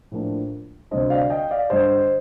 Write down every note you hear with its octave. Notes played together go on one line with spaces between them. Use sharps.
A2 F3 A#3 D4
D2 C3 G3 D4 C5 D#5
D5 F5
D#5 G5
D5 F5
G2 D3 G3 C5 D#5